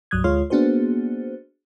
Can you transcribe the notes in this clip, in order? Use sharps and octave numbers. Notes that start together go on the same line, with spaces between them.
C2 G2 F#3 D#6 F#6 G#6
D2 G#3 F4 C#5 C6 F6
A#3 B3 D4 F#4 G#4 C5